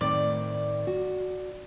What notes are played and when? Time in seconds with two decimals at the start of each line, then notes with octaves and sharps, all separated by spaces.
0.01 A2 D#3 C4 D5
0.87 F#4